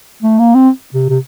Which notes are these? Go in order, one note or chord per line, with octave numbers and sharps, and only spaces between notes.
A3
A#3
C4
C3
C3